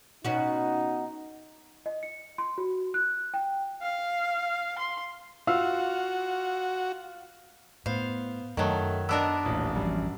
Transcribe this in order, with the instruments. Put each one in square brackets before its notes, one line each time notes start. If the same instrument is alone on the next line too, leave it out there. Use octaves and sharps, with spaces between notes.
[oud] B2 C#4 F#4 [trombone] D#4
[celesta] D#5
C#7
C6
F#4
F#6
G5
[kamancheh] F5
C6
[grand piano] F4 F5 E6 [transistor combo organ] F#4
[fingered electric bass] A2 [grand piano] B3 C5 [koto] F5
[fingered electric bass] F#2 [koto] D#3 F#3 [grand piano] A3 A5
[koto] B3 D4 A#4 [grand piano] D#5 E6
[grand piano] D#1 A1 D#6
[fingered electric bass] A1 E3 F3 [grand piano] F#2 G3